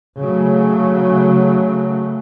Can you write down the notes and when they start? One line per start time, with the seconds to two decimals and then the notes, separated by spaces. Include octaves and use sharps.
0.19 C#3 F#3 A3